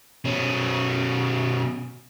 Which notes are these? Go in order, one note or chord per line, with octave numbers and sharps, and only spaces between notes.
B2 C#4